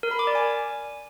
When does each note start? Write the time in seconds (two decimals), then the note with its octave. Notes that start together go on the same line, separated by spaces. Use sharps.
0.03 A#4
0.11 B5
0.19 D6
0.27 D5
0.35 G#5